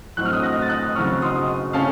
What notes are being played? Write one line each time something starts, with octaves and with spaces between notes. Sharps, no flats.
A2 F#3 C4 F#6
F6
D#6 F#6
F#6 A#6
A6
D#6 F#6
C#3 F#3 C4 C#6 F6
C6 D#6
C#3 A3 C#4 F5 A5